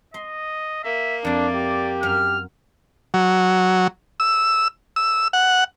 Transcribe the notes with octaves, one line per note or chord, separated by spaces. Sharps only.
D#5 C6
A#3 E5
F2 D4 E4 D5
G4
F#2 F6
F#3
E6
E6
F#5